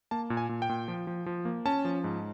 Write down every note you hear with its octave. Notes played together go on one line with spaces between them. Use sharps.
A#3 A5
A#2
G#5
A#2
G5
A#2
F3
F3
F3
A#3
C#4 A5
F3
G#2